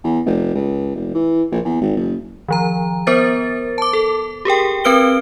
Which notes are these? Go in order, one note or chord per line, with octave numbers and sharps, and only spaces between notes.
E2
F1
C#2
F1
E3
A#1
E2
G#1
F#1
D#3 F3 A#5
B3 A#4 C5 A6
A5 D6
A4
G4 G#4 A#4 G5
C4 A#4 B4 F6 D7 G7